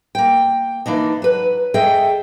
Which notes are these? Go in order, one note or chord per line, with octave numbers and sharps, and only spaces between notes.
A#3 G5
E3 A#3 D4 D#4
F#3 B4
G#4 A4 D#5 E5 G5